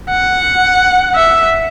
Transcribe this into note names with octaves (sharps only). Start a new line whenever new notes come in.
F#5
E5